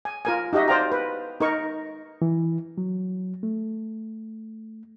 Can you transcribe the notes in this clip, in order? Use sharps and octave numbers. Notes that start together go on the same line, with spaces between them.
G#5
F4 A#4 G#5
D#4 F#4 G4 D#5 E5
C5 D5 F5 G5 A#5
B4
D#4 A#4 C#6
E3
F#3
A3